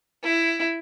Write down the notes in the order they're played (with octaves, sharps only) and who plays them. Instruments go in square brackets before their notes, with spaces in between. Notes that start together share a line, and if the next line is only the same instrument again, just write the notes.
[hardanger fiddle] E4